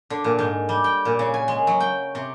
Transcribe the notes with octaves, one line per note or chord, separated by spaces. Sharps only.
D3
A#2
G#2
G3
G5
A#2
C#3
G#5
G#3
F#3
G5
C3